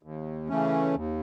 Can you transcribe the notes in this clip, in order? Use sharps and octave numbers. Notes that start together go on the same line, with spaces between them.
D#2
C#3 E3 A3 C#4
D#2